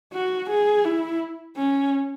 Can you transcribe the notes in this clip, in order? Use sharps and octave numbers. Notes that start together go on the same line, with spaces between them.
F#4
G#4
E4
C#4